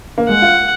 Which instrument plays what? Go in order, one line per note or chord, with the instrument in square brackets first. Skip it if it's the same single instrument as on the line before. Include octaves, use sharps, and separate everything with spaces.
[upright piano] A#3
[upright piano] G#3 [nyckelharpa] F#5
[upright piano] F4